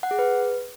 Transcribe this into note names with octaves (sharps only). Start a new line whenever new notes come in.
F#5
G#4
B4